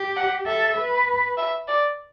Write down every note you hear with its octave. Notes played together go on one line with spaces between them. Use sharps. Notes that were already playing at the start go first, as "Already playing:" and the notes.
Already playing: G4
F#5
A4 E5
B4
E5
D5